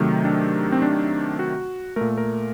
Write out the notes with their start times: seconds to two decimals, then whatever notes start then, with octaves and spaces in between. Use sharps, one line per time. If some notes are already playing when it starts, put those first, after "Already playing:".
Already playing: C3 D#3 F#3 A3
0.24 D4
0.72 C4
0.82 D4
1.39 F#4
1.96 A#2 A3 A#4
2.18 A#4